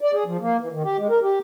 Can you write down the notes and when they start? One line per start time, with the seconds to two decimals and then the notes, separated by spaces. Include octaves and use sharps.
0.01 D5
0.13 G#4
0.26 F3
0.41 A#3
0.60 E3
0.72 D#3
0.84 G4
0.98 G#3
1.10 A#4
1.22 G4